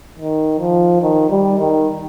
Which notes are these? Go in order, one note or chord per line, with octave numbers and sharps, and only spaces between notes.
D#3
F3
D#3
G3
D#3